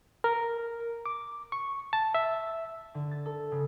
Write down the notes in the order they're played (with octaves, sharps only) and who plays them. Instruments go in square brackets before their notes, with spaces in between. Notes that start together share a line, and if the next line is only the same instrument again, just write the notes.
[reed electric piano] A#4
D6
C#6
A5
E5
[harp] D3
A6
A4
C#3